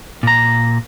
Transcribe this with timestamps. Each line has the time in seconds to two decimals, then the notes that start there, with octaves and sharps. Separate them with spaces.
0.23 A#2 A#5